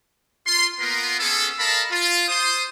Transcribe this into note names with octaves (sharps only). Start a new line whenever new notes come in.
F4 C6
A#3 B3 F4 A#4 B4 C6
B3 C#4 G#4 A4
A4 A#4 D#5 F5 A5 B5
F4
C5 C6 D#6